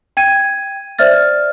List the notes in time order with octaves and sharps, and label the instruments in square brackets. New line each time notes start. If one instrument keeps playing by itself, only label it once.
[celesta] G5 G#6 D#7
C5 D5 E5 F6 A6